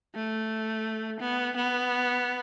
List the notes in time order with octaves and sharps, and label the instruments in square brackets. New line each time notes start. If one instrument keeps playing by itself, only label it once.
[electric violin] A3
B3
B3